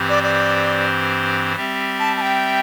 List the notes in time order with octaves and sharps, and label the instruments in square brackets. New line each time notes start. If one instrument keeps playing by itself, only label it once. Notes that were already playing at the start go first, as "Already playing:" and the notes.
Already playing: [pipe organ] G2 E3 C4 G4 C5
[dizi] D5
D5
[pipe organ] G3 C4 G4 E5
[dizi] A5
A5
G5